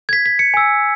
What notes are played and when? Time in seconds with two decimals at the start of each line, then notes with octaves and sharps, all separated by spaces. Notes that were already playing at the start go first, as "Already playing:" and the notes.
0.09 G#6
0.13 B6
0.26 B6
0.39 C#7
0.54 G#5 E6